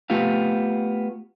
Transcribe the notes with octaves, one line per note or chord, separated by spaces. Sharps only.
A3 B3 F4 G4 F5